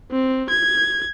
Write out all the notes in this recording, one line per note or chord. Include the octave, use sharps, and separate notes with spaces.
C4
G#6